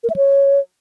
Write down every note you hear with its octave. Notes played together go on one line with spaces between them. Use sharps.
A#4
E5
C#5